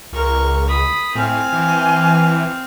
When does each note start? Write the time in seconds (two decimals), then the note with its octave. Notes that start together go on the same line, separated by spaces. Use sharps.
0.13 C#2 A#4 C#6
0.68 B5 D#6
1.15 A2 C4 F5 G#5
1.53 E3